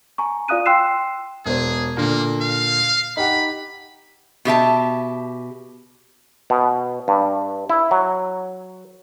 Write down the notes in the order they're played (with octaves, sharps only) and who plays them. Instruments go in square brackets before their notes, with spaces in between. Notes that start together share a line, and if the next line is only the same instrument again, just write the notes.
[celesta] G#5 A#5 C#6
F4 D5 F5 D#6 F#6 D#7
G5 C6 E6 F#6 C7 E7
[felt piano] E1 C5 [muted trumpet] G#4
[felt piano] A#2 D3 [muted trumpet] A#3
[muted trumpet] F5
[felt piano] D#4 G4 F#5 [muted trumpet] B5
[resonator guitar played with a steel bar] B2 G4 E5 A5
[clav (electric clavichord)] B2
G2
E4
F#3